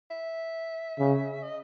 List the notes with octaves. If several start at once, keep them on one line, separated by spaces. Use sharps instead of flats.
E5
C#3
D#5